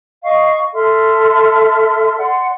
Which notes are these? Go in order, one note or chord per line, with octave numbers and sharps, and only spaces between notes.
D#5 F5 C#6
A4 E5 C6 F6
D5 F#5 C6